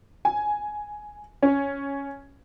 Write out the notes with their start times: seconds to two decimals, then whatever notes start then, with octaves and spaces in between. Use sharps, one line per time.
0.25 G#5
1.43 C#4